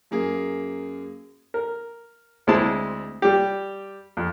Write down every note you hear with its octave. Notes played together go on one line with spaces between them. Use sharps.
F#2 A#3 G#4
A#4
D2 G#3 C4 E4 A5
G3 G4
F2